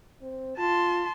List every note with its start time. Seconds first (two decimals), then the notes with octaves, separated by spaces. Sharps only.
0.22 C4
0.58 F4 A5 C6